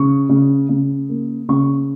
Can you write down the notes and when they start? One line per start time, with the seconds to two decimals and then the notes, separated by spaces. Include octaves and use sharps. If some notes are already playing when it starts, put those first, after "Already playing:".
Already playing: C#3 C#6
0.29 C#3
0.69 C#3
1.09 A#3
1.49 C#3 C#6